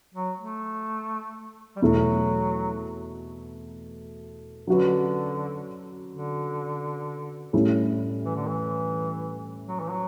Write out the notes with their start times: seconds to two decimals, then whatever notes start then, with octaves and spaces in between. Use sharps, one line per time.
0.15 F#3
0.38 A3
1.76 G3
1.82 E2 B2 F#3 A3 E4 A4
4.67 D3 F#3 C#4 F#4 B4
6.10 D3
7.53 A2 G3 C#4 E4 A4
8.25 E3
8.36 D3
8.46 E3
9.68 F#3
9.80 E3
9.91 F#3